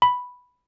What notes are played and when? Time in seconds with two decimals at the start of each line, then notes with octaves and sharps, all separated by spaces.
0.02 B5